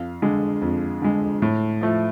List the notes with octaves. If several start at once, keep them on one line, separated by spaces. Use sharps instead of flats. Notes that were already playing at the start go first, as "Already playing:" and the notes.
Already playing: F2 F5
D3 G#3
F2
D3 G#3
A2
F3 A3